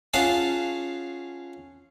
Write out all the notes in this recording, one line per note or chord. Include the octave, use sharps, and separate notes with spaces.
C#4 F4 G#4 F5 F#5 A5